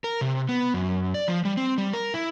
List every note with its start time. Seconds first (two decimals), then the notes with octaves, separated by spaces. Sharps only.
0.04 A#4
0.21 C3
0.49 B3
0.74 F#2
1.14 D5
1.28 F3
1.45 G3
1.57 C4
1.78 G3
1.94 A#4
2.14 E4